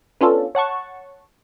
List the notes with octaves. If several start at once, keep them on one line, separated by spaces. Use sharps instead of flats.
B3 C#4 D4 F4 A4
C#5 F#5 A5 C#6